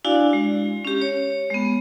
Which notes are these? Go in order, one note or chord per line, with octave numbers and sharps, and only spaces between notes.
D4 E4 F#4 D5 F5 G#5
G#3
C#4 G4
C#5
G#3 B3